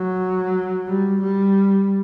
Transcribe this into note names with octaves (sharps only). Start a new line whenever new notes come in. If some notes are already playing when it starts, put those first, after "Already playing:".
Already playing: F#3
G3
G3